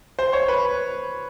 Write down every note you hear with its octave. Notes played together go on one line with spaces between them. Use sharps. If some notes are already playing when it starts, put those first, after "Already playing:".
C5
C#5
B4